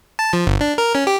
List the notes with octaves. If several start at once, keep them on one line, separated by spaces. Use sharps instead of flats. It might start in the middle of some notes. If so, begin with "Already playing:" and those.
A5
F3
G1
D4
A#4
C#4
G4